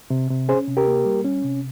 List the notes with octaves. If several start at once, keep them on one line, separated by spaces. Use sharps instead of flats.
C3
C3
C#4 G#4 C5
C3
G4 A#4
A#3
G3
C#4
C3